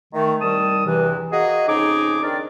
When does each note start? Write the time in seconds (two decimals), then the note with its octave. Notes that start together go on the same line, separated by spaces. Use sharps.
0.13 D#3 A3
0.42 C2 D#3 G3 A5 D#6
0.86 E2 G2 C3 E3
1.33 A#3 F#4 G#4 D#5
1.68 F2 C#3 D#4 G#4 D6
2.23 D#3 C4 D4 A#4 D5